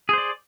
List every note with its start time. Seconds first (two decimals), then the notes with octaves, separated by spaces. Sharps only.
0.09 G#4
0.13 C5
0.18 D5